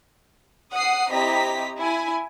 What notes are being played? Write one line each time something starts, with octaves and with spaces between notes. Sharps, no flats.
F#5 D#6 C7
C4 E4 G4 D#5 A#5 B6
E4 G#5